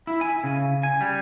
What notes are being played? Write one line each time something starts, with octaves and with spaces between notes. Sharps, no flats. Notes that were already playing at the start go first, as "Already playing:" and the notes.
E4
G#5
C#3
G#5
G3